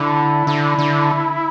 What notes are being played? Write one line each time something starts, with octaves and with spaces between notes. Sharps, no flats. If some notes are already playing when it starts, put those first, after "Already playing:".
Already playing: D3 E4
D3 E4
D3